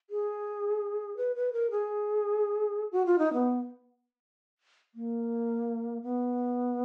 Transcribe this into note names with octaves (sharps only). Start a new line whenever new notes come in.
G#4
B4
B4
A#4
G#4
F#4
F4
D#4
B3
A#3
B3